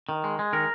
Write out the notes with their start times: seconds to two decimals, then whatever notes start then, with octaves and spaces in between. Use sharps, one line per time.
0.09 D#3
0.24 G#3
0.39 G#3
0.53 D#3 A#4